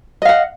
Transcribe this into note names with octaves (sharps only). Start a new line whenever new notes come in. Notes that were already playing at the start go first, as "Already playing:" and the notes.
D#5 F5 F#5